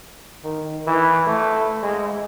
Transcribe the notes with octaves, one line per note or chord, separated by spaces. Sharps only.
D#3
E3
A3
G#3